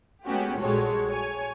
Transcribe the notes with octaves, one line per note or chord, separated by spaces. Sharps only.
G#3 A3 B3 C#4 F#4 G4
A#1 G3 G#3 F#4 A4 C#5
C#5 G#5